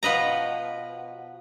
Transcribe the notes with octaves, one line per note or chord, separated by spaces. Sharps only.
B2 F3 B4 D#5 A#5